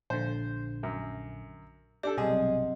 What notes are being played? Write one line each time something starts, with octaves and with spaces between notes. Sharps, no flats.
A#1 D3 C5
F#2
D4 G4 A4 A5
B1 G2 C3 F#3 C4 G#4 D#5